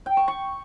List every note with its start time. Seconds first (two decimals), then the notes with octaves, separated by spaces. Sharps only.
0.06 G5
0.17 C#6
0.28 C#6